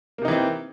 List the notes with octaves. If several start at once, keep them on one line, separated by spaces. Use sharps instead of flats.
C3 E3 A#3 C4 D#4